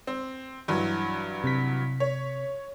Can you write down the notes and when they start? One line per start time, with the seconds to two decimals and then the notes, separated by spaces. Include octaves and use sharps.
0.07 C4
0.68 G2 E3 F#3
1.44 C3 B6
2.00 C#5